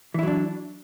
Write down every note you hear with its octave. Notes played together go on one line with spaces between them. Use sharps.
E3 F#3 D4 E4